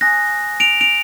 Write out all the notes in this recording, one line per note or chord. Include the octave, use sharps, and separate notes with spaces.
G#5 D#6 F#6 A#6
D7 F7
D7 F7